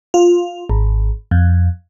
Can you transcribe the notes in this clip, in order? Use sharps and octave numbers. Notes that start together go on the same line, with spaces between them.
F4
G#1
F2